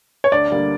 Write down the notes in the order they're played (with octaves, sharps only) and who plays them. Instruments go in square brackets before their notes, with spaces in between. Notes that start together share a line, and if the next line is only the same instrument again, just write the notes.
[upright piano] C#5
D2 D5
D3 G3 A#3